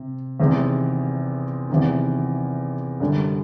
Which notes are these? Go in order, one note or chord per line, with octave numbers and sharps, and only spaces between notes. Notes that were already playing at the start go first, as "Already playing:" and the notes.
Already playing: C3
E2 C3 D#3 G#3
E2 C3 D#3
F#2 D3 G3